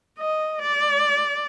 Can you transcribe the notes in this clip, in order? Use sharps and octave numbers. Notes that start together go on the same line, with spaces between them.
D#5
D5